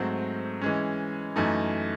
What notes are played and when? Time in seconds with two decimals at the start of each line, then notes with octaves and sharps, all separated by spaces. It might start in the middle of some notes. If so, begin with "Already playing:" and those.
Already playing: G#2 F#3 A3 C4
0.62 E3 G#3 C#4
1.36 F#2 E3 A3 D#4